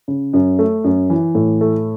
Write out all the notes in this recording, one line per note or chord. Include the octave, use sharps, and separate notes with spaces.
C#3
F#2
A3
F#2
E3
A2
A3